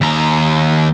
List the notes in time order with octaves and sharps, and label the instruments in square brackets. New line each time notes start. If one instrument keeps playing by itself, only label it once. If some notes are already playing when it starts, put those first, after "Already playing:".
[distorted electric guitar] D#2 A#5